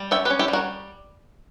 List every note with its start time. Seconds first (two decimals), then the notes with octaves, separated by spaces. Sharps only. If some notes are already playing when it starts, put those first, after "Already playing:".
Already playing: G3
0.11 C#4 E5 G5
0.25 G4 B4
0.30 C#4
0.39 E4 G4
0.48 G3
0.53 F#4 A#4